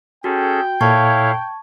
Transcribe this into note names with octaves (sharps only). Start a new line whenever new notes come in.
C#4 F#4 G#4 A4 G5
A#2 E4 A4 C#5 F5 A5 C#6 G#6